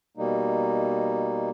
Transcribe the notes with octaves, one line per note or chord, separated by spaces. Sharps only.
B2 G3 A#3 D#4